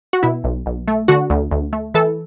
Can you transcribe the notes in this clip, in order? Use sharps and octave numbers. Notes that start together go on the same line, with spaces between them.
F#4
B2 E4
B1
B1
A3
D3 F#4
D2
D2
A3
E3 A4